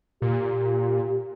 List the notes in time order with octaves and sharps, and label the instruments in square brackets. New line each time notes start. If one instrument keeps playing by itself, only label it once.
[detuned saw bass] A#2 [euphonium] G4